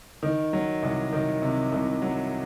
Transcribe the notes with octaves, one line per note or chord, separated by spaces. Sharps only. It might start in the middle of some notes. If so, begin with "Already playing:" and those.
D#3
F#3
C2
D#3
C3
C2
F#3